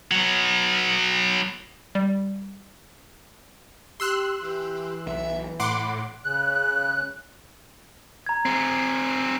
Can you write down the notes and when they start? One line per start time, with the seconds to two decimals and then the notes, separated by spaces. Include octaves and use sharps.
0.11 F#3 B3
1.95 G3
4.00 G4 C6 E6 F#6
4.42 E3 G4
5.06 B1 E5
5.60 A2 F#5 B5 C6 D6
6.24 C#3 F#6
8.26 A#5 G#6
8.46 C4 G#4